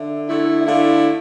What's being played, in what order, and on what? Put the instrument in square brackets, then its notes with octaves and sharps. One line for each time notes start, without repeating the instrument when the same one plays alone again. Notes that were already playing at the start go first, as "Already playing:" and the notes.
Already playing: [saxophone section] D3 [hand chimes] E5
[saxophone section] D3 A3 E4
[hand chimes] E5
[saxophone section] D3 A3 E4 [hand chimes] F5